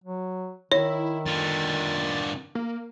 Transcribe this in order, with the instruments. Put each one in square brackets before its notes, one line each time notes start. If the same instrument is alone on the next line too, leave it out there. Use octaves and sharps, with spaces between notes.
[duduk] F#3
[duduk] D#3 [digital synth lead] E4 [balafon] C#5
[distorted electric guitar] D3 F4 [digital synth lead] A6
[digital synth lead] A#3